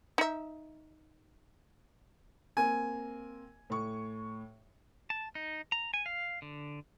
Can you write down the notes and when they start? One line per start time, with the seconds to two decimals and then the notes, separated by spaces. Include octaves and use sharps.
0.18 D#4 E5
2.57 A#3 C4 G#5
3.70 A2 C#6
5.10 A5
5.35 D#4
5.72 A#5
5.94 G#5
6.06 F5
6.42 D3